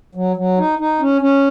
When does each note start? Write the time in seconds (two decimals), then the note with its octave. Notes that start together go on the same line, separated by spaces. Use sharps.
0.15 F#3
0.36 F#3
0.58 D#4
0.79 D#4
1.00 C#4
1.22 C#4